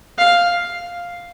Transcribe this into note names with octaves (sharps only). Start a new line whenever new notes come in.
F5